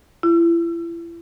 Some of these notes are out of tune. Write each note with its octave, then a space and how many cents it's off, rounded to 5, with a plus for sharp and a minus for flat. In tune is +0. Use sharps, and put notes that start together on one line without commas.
E4 +35